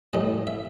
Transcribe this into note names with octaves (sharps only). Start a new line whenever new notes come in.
A2 G3 D#5
E5